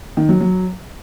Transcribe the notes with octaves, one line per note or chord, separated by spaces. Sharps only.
D#3
F#3
F#3